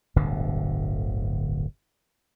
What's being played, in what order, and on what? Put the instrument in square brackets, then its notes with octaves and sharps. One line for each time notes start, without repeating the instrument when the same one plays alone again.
[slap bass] D1 G1 B2 D3